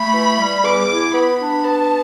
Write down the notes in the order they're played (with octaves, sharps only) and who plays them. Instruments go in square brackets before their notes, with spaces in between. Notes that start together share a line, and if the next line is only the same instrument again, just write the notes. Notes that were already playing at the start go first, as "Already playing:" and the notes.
Already playing: [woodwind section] A3 [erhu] B5
[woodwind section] E3
G3
[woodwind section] E2 [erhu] D6
[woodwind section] E4
[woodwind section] B3 [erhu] B5
[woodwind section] D4
[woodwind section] B3 [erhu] A5